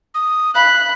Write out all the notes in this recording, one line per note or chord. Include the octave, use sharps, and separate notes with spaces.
D#6
F5 B5 F#6